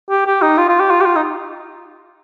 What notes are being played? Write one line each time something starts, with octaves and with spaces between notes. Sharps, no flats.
G4
G4
D#4
F4
F4
G4
F4
G4
F4
D#4